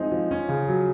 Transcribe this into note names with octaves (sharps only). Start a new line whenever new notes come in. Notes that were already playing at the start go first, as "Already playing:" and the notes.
Already playing: F3 G#3 C4 D#4
F3
C#4
C#3
F#3